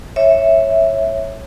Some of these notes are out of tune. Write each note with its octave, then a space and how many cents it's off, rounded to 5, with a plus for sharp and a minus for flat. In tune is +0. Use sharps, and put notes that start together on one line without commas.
C#5 -10 E5 +0